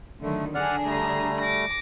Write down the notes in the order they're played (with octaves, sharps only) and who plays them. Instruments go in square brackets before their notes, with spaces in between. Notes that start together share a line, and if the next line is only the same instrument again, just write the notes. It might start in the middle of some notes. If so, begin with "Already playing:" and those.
[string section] D3 D#3 F#3 [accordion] A3
[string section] D3 D4 G#4 [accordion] D5 F#5 F6
[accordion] G3 A3 [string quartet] A#5
[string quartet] D6 A#6